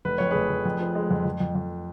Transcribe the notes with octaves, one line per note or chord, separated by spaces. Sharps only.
F1 B4
F2 C#5
F1 G#4 B4
F1
F2
F3
G#3
F2
F2
F2
F2